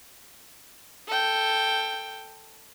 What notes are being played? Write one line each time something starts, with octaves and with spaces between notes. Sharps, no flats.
A4 G5